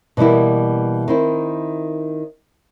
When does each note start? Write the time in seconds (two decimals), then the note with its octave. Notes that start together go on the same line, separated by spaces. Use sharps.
0.17 B2 E3 G3 A#3 E4
1.08 D#3 C4 E4